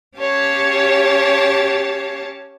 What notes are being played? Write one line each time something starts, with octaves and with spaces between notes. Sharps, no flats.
C#4 G4 C#5 F5 A5